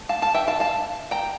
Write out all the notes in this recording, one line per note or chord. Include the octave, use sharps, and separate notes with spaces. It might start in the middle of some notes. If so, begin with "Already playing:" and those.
Already playing: A3
F5 A5
F5 A5
E5 G5
F5 A5
F5 A5
G5 A#5